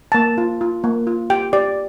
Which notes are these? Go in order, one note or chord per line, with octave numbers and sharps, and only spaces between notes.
A#3 A5
F4
F4
A#3
F4
G4 G5
G4 D5